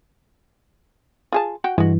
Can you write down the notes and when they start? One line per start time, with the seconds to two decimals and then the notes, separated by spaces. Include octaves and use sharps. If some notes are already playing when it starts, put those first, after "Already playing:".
1.32 F4 G#4 A5
1.64 F#4 F#5 G5
1.78 G2 E3 G#3 F#4